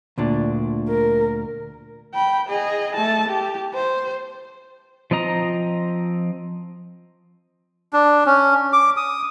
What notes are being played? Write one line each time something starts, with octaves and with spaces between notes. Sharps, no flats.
D2 A#2 D4
A#4
G5 B5
G#4 D#5
A3 A5
G4
C5
F3 C4 D#5 A#5 D#6
D4
C#4
D6
D#6